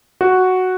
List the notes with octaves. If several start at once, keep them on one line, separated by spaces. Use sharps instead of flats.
F#4